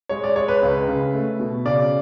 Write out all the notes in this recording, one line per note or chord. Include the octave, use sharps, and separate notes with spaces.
G#3 C#5
D5
G#3 C#5
B4
C#2
C#3
A3
B2
C#3 D5